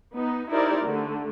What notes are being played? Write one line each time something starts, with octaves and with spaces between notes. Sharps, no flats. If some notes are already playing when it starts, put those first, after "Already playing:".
B3 D#4
D#4 E4 G4 A#4 C5 D5
D3 A3